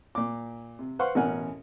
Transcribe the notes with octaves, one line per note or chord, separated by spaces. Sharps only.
A#2 D6
C3
B4 C5 F5 F#5 C6 C#6
A1 B2 C#4 A#4 F#5 G#5